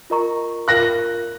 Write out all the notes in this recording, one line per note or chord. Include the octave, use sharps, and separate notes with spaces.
F4 A#4 D#5 A#5 C#6
F4 A#4 F5 F#6 A#6